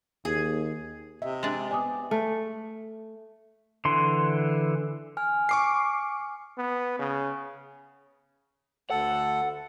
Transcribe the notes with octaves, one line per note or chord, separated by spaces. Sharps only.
D#2 G#4
C3 D#5 E5
G#3 D4
B3 G4 D5 G#5 D6 D#6
A3
D3 E3 C6
G#5 F6
C#6 D6 C7
B3
C#3
D2 A4 F#5